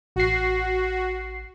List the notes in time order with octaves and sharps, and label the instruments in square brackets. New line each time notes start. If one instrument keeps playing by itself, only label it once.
[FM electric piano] A1 C7 [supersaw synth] F#4